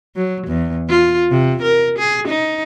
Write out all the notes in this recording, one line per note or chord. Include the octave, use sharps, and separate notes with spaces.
F#3
E2
F4
C3
A#4
G#4
D#4